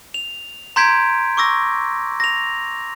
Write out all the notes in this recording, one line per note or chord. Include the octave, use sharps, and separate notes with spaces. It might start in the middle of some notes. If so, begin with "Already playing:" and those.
F7
A#5 C6 G6 G#6 B6 D7
C#6 D6 E6 A#6
A#6 F7